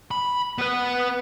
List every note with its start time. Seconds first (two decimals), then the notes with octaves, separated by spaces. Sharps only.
0.11 B5
0.58 B3 B4